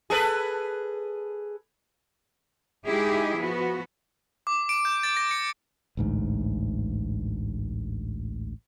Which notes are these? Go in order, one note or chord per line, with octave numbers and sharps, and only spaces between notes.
G#4 A4 B4
G#3 D#4 E4 G4 G#4
F3 B3 F#4
D6
D7
G6
A6
A#6
C#7
A1 D2 G#2